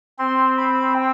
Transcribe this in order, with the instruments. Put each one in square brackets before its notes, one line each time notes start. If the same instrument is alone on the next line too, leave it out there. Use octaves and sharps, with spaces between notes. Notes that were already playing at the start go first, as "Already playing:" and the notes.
[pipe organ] C4 [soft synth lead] C6
[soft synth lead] B5
G5